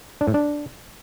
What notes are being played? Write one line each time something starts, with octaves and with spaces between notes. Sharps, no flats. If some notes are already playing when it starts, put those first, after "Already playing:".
D4
A2
D4